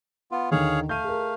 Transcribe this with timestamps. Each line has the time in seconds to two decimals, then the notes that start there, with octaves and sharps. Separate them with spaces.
0.32 B3 F4
0.51 D#2 D3 D#3 G#4 C#5 F5
0.89 A3 F5 G6 D#7
1.04 G#4 A#4